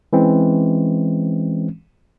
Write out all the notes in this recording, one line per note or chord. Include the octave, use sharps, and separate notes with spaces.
E3 G#3 C4 C#4